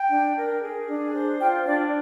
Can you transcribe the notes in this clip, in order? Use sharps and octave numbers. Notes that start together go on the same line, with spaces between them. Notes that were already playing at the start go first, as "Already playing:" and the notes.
Already playing: G5
D4
A#4
G#4
D4
C5
F4 G5
D4 D5